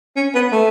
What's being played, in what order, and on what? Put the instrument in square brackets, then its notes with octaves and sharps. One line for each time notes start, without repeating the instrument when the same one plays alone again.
[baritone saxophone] C#4
B3
A3